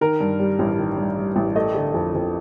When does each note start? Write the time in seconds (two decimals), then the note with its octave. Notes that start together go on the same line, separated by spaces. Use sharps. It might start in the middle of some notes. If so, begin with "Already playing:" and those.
0.01 D#3 A#4
0.20 G2
0.40 G3
0.59 A1
0.79 D#3
0.98 G2
1.18 G3
1.36 A1
1.56 A3 D#5
1.75 D3
1.94 F2
2.14 F2